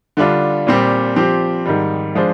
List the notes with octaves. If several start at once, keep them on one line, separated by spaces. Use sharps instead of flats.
D3 G3 D4 F4
A#2 G3 C4 G4
F3 C4 G4
G#2 D#3 G3
F3 G#3 D4 F4 C5